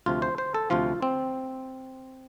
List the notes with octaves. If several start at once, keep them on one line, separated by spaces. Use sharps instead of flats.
D2 C3 F3 F4
C5
C5
A4
D2 C3 F3 F4
C4